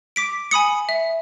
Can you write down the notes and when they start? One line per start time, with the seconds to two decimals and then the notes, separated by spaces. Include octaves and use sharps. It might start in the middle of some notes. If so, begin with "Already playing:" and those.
0.16 D6 B6 D7
0.51 G#5 B5 D#6 C#7
0.89 E5